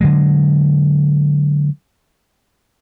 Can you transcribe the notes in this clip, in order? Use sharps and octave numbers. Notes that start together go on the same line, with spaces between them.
D3 F#3 G#3